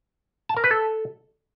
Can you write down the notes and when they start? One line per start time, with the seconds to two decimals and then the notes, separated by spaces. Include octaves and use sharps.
0.49 A5
0.57 A#4
0.64 B4
0.71 A4